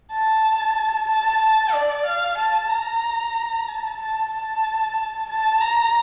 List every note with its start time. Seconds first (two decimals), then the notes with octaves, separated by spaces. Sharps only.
0.12 A5
1.09 A5
1.42 A5
1.73 D5
2.06 F5
2.38 A5
2.70 A#5
3.68 A5
4.00 A5
4.32 A5
5.29 A5
5.61 A#5